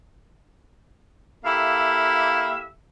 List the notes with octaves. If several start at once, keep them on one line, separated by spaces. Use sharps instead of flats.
A#3 E4 G4 A4 E5 F5